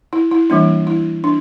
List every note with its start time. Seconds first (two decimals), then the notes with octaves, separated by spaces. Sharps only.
0.13 E4
0.31 E4
0.50 E3 G3 A#3 D4
0.87 E4
1.24 D4